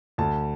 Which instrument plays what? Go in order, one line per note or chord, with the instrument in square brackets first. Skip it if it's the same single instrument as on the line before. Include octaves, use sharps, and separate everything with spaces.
[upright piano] D2 A5